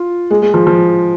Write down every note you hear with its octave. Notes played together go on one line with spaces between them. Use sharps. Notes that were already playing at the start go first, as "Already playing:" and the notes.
Already playing: F4
G#3
G#3
F3
F3